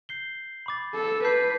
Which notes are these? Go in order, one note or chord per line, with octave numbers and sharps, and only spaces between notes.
G6 C7 G7
B5 D6 A6
A4
B4 A5 D6 G6 C7